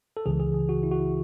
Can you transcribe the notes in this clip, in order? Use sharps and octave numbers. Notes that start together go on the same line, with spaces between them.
A4
C#2 C#3 E3 G#4
G#4
G#4
F#4
E4
F#4
E4